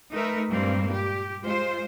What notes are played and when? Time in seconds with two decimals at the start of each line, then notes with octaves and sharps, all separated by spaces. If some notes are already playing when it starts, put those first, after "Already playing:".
0.12 A3 D#4 A#4 B4 E5
0.51 G2 A#2 G3 G#3 A#3 C4
0.93 G4
1.43 G#3 F4 C5